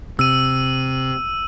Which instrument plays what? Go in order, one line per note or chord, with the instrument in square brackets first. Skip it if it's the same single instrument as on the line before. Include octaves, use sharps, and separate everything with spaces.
[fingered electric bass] C3 [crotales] E6 D#7